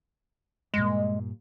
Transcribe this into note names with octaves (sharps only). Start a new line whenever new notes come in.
G2 A#2 G#3